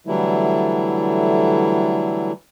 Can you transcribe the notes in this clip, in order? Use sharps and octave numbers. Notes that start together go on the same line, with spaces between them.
D3 E3 F#3 G3 A3 E4